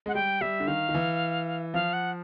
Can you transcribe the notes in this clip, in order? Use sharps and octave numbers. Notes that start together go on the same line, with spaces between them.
G#3 F#5
G3 G5
G3 E5
D3
D#3 F5
D#3
E3
F3 F5
F#5